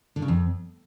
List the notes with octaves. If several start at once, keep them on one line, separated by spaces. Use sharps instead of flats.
D3
C#3
F2